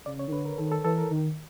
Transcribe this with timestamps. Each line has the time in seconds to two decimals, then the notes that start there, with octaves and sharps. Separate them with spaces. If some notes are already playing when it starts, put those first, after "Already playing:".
0.06 C#3 D5
0.19 C#5
0.28 D#3
0.32 D3 B4
0.45 A#4
0.58 D#3 A4
0.72 A4
0.84 E3 A4
0.98 A#4
1.10 D#3